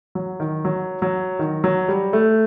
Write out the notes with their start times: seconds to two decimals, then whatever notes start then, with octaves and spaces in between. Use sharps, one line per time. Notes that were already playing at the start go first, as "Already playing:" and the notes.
0.15 F#3
0.40 D#3
0.65 F#3
1.02 F#3
1.39 D#3
1.64 F#3
1.88 G3
2.13 A3